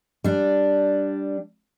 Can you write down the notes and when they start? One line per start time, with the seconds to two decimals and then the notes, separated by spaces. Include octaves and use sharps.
0.24 G3 D4